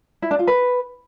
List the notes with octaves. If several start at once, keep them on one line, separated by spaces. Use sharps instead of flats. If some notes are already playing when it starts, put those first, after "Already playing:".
E4
D4
F4
B4